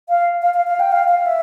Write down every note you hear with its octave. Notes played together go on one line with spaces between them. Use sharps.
F5
F5
F5
F5
G5
F5
F5
E5